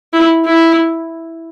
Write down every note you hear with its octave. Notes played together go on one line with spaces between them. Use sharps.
E4
E4